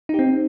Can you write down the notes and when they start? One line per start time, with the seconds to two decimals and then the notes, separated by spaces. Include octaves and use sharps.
0.09 D#4
0.14 G4
0.19 C4